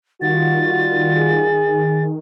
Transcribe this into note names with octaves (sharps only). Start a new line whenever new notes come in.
D#3 G3 F4 F#4 A6
G#4